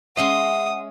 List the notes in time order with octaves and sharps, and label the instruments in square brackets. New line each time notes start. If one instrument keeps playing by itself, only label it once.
[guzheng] G#3 C#4 C6 [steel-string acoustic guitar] E5 [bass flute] F#5 [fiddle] D#6